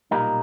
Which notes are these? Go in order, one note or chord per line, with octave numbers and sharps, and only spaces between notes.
B1 A#2 G3 A#3 D#4